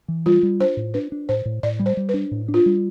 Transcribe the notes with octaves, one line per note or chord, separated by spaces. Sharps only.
E3
G3 F4
G3
D4 C5
A2
D4 B4
D4
A2 C5
A2
A2 D5
G3
C5
G3
B4
D4
A2
D4
F4
G3